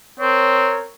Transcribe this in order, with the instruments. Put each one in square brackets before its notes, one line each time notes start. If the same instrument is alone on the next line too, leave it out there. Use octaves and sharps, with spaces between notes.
[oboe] C4 [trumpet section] A#4 C#5